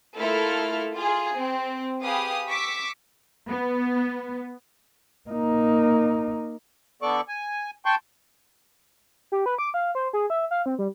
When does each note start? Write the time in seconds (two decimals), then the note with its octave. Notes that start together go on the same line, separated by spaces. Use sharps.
0.17 A3 A#3 E4 F4 A4 F6
0.95 F4 G#4
1.36 C4
2.02 G4 G#4 B4 F5 B5 D#6
2.49 C#6 D6 E6 B6
3.48 B3
5.29 A#3 D#4
7.02 D3 B3 A4 D5 C#6 D6
7.28 G#5
7.85 G5 A5 C6 C#6 G6
9.32 G4
9.46 B4
9.59 D6
9.74 F5
9.95 C5
10.13 G#4
10.30 E5
10.51 F5
10.66 C4
10.79 G3